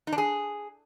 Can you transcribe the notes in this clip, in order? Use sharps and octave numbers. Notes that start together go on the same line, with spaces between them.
D#4
D4
G#4